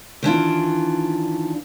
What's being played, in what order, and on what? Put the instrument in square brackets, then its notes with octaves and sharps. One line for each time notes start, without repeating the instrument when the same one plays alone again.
[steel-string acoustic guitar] D#3 E3 D4 F4